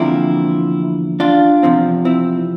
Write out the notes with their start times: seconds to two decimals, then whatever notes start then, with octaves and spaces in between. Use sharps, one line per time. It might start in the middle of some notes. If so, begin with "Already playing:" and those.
Already playing: E2 D3 F3 A#3 C4 E4
1.20 D4 F4
1.63 E2 C3 F3 C4
2.05 C4 E4